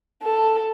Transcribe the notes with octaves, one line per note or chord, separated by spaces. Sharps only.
A4